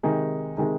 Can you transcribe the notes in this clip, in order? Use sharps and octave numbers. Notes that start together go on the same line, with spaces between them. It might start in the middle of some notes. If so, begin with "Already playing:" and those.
C3 D#3 G#3 D#4
C3 D#3 G#3 D#4